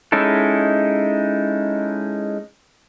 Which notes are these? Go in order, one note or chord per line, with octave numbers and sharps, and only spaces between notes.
G#3 C#4 D#4 E4 A4